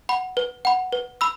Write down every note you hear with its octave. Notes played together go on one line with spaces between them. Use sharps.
F#5 B5
B4
F#5 B5
B4
B5 E6